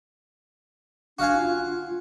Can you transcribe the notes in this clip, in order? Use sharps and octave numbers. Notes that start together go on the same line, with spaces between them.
D4 F#4 F5 G#5
F4